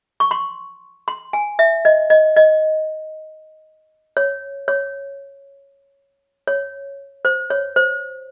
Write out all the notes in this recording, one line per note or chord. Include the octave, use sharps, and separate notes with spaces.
C#6
C6
C6
G#5
E5
D#5
D#5
D#5
C#5
C#5
C#5
C5
C#5
C5